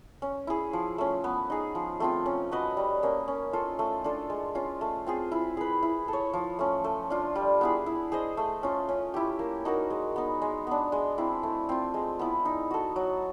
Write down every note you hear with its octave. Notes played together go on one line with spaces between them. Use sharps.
C#4
E4 G#4
F3
A3 C#4
B3
D#4 G#4
F3
A3 C4 F4
C#4
F#4 B4 D#5
G3
A#3 C#4
C#4
F4 A4
A3
D4 F4 A4
G#3
C#4 F4
A3
C4 F4 G#4
E4
G#4 B4
E4
A4 C#5
F3
A3 C#4
A3
D4 F4
G3
B3 E4 G#4
E4
G#4 C5 D#5
A3
C#4 F4
C#4
E4 G4
A#3
D#4 F#4 A#4
G#3
B3 D#4
G#3
B3 D4
G#3
C4 E4
A3
C4 F4
G#3
B3 E4
D#4
F#4 A4
F#3